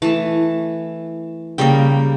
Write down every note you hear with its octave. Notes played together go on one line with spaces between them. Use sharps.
E3 A3 A5
C#3 G3 A#3 G5